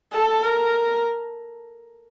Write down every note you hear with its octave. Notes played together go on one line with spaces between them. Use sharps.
A4
A#4